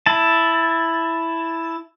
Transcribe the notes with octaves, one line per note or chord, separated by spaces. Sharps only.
E4 A5